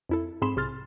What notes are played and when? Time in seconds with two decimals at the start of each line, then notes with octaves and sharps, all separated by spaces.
0.09 F2 E4 A4
0.42 G#2 C4 G#4 B5 C6 E7
0.56 B1 C3 G#4 C6 F6 A6